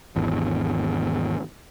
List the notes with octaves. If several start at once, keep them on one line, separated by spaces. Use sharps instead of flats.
G#1 E2